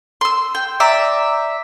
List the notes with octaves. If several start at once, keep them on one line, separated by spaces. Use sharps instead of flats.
C6 E6
G5
D5 E5 A#5